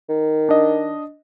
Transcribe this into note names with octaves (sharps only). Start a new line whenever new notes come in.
D#3
D4 D#5